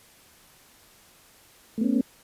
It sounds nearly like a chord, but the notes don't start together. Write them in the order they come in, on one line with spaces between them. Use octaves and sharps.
A3 B3 C#4